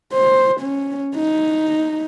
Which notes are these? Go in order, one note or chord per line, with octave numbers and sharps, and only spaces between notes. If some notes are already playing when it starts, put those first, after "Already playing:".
C5
C#4
D#4